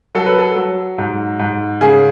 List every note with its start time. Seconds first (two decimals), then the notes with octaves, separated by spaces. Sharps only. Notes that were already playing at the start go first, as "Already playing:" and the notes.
0.15 F#3 A4
0.26 B4
0.38 A4
0.56 F#3
0.98 G#2
1.39 G#2
1.81 C#3 G#4